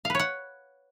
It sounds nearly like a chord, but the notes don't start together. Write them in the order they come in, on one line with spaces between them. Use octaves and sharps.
F5 B4 C#5 F#5